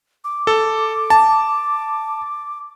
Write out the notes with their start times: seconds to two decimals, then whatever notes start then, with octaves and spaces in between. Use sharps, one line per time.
0.24 D6
0.47 A4
1.10 A5